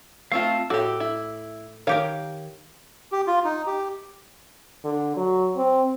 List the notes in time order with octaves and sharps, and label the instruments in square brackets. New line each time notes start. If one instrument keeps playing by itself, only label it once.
[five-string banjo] A3 C4 F4 [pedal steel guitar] F5 A5
[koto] A2 [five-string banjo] F#4 G4 [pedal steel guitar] D6 E6
[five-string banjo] E4
[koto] D#3 G4 A#4 [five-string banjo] C#5 F5
[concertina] G4
F4
D#4
G4
[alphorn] D3
F#3
C4